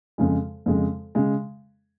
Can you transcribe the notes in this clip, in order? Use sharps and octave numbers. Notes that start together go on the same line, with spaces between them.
F2 C#3 G#3
F2 C#3 G#3
C#3 G#3